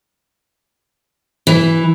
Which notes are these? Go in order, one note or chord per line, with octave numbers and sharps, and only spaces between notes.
E3